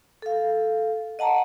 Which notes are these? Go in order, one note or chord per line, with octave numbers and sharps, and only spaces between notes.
A4 F5
D#5 F#5 A5 A#5